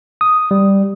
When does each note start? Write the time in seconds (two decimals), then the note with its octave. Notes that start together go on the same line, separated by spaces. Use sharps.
0.21 D#6
0.51 G3